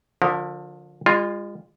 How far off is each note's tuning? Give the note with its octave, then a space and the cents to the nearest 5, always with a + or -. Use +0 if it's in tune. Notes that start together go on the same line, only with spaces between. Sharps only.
D3 +0 F3 +30 A#4 -10
G#3 -40 F4 +0